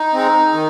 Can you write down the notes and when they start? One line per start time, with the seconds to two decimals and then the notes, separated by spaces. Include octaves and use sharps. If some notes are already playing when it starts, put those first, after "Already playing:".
Already playing: D#4
0.14 G#3 C4
0.53 D#3